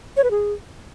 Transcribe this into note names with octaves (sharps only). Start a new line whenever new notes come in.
C#5
B4
G#4